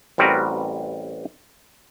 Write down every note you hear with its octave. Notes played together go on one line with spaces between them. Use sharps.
A1 G3 C4 F#4 A#4 B4